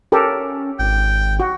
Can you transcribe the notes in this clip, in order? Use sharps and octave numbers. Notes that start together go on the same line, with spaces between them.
C#4 G4 A4 A#4
G#1 G5
F#4